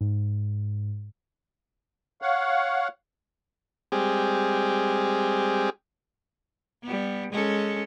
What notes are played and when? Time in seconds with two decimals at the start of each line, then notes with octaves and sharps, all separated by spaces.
0.01 G#2
2.22 C#5 F5 F#5
3.92 G3 G#3 C4 G4 G#4
6.83 G3 B3
7.32 G#3 C#4 A4